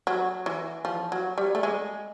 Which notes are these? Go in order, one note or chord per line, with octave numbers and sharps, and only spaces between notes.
F#3
E3
F3
F#3
G3
A3
G#3